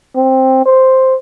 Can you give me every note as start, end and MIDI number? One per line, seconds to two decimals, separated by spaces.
0.16 0.65 60
0.66 1.15 72